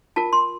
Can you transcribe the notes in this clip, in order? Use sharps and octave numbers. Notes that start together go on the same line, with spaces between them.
F4 A#4 A5
C6